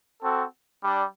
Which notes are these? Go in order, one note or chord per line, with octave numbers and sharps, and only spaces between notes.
C4 F#4 A4
G3 D4